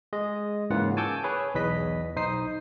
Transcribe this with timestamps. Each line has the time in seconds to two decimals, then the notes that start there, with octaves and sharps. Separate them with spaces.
0.13 G#3 D#5
0.70 G#2 C#3 E3 A#3 F4 F#5
0.97 G#5 A5 C#6 D6 E6 G6
1.24 G#4 B4 C#5
1.54 B1 E2 B4 D#5 B6
2.16 B1 D#4 C5 D#6 C7